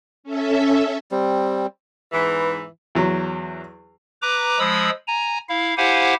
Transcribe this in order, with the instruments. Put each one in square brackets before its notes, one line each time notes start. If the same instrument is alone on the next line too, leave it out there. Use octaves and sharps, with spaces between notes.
[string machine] C#4 A4 E5
[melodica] G3 C4
[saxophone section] E2 G#2 E3 [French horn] B4
[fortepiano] E2 F#3
[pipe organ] B4 A#5 D6
F3 G#3 B5 D#6 E6
G#5 A#5
E4 F5
E4 G4 C5 F5 F#5 G#5